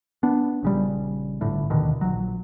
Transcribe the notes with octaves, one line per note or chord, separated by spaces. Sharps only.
B3 D4
A#1 C#3 G3
G1 A2 D3
D2 B2 D3 D#3
A#1 F#3